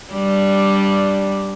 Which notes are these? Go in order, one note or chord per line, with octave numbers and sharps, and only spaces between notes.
G3 D4